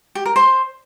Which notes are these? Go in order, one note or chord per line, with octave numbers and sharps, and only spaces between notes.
G4
A#4
C5